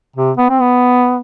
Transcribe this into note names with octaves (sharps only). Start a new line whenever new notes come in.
C3
B3
C4
B3